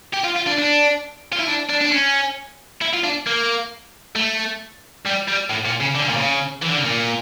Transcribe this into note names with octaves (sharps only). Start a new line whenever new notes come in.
G4
F4
F4
D4
D4
F4
E4
D4
D4
D4
C#4
E4
F4
D4
A#3
A3
G3
G3
A2
A#2
C#3
D3
C#3
A#2
C#3
E3
D3
C#3
A#2